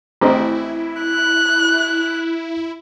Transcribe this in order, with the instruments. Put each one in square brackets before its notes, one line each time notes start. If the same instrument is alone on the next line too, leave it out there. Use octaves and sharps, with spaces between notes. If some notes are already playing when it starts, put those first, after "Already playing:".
[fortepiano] A1 C4 D#5 [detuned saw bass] E4
[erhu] F#6